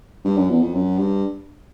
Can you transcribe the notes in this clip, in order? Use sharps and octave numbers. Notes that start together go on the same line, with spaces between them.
G2
F#2
E2
F2
F#2
G2